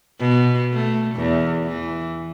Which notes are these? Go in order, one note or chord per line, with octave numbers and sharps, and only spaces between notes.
B2
A3
E2
E3